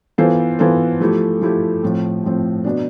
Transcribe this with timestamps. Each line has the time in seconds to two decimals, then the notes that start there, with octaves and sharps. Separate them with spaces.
0.18 E3 B3 F4 A4 C5
0.59 E3 B3 F4 A4 C5
1.00 F3 A3 E4 G4
1.41 F3 A3 E4 G4
1.83 A2 F3 C4
2.24 A2 F3 C4
2.64 B2 B3 D4